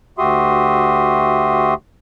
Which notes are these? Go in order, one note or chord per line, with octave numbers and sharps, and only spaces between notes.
D2 F#4 G4 E5 C6 D#6